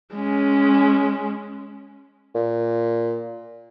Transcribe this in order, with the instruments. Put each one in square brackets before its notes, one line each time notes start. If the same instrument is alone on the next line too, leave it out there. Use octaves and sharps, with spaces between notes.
[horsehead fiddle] G#3 C#4
[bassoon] A#2